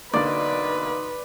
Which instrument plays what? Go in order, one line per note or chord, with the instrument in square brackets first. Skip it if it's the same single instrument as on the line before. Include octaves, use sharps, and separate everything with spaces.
[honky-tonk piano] B1 D3 A#3 [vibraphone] D#4 C6 D#6 [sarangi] B4 [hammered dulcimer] D5